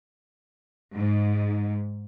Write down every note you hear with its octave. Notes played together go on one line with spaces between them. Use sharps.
G#2